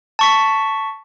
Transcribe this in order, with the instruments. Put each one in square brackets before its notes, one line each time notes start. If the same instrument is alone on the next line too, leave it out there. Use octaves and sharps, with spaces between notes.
[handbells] A5 C#6 B6